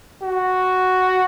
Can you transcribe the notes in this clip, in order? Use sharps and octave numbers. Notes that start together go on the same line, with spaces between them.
F#4